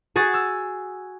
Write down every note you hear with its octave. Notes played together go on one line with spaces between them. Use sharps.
F#4 G#4 A6
E6